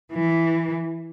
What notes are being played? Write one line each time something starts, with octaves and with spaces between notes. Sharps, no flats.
E3